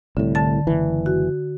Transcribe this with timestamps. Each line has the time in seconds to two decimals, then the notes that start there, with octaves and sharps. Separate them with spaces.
0.17 C2 A2 D3
0.35 D3 A5 A6
0.67 F#1 E3
1.06 F#4